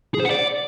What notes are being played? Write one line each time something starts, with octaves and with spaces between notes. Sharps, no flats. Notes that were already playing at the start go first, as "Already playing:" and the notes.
G#4
C5
F#5
D5